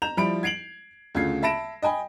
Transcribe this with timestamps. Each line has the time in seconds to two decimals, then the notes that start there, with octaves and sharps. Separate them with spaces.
0.02 A#5 G6 E7 F7
0.17 F3 G3 E4 B5 D7
0.43 G#6 C7 D7 F7 F#7
1.15 D2 C#3 F4 G#6 C7
1.43 E5 A5 B5 A#6 D7 E7
1.83 D#5 G5 G#5 B5